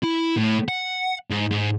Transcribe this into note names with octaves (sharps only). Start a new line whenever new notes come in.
E4
A2
F#5
G#2
G#2